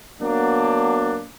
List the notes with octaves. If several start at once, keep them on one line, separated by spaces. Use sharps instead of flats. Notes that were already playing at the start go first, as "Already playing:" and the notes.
F#3 A#3 B3 D4